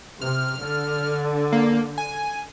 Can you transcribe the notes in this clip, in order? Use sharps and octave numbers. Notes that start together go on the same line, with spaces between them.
C3 F6
D3
A#3
G#5